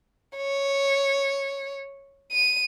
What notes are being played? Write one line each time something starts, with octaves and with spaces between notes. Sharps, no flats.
C#5
D#7